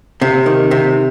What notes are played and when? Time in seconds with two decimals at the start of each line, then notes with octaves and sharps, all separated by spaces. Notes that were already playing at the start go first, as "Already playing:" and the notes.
0.22 C3
0.46 D#3
0.71 C3